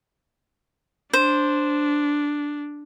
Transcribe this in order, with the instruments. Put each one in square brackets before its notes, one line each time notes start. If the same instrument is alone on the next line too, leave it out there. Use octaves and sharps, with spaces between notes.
[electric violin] D4 [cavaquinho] C5